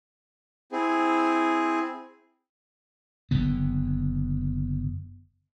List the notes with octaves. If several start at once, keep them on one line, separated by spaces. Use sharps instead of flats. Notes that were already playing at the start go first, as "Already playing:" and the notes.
C4 E4 G#4
F#1 D3 B3